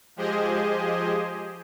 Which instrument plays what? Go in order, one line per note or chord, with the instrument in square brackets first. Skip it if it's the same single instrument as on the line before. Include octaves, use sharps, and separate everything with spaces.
[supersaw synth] F3 G#3 G4 G#4 C5 D#5